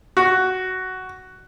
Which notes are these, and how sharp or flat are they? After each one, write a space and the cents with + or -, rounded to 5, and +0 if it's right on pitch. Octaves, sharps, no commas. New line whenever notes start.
F#4 +10